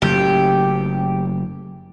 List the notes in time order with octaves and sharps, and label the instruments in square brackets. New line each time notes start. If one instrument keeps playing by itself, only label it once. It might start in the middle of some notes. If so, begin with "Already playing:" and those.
[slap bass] F#1 F#2 A2 [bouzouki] G4